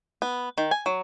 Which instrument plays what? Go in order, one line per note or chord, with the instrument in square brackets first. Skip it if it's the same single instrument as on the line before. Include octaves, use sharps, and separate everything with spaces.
[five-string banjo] B3
D#3
G#5
F#3